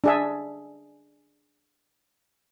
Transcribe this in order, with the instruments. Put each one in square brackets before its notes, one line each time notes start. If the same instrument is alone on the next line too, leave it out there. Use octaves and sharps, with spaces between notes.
[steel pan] D4 G#4 E5